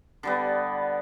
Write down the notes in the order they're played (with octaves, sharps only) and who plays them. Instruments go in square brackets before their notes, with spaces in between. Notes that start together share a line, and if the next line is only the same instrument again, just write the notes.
[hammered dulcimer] D3 G3 B3